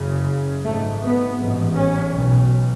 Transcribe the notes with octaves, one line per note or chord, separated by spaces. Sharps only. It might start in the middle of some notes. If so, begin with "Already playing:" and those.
Already playing: F#1 F#2 C#3
G#1 G#2 A3
B3
A1 G#2
C#4
B1 B2